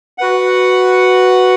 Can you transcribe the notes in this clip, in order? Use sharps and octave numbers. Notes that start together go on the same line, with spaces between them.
F#4 B4 F#5